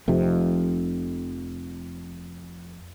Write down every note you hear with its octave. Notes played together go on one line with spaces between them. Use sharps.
F1 F2 C3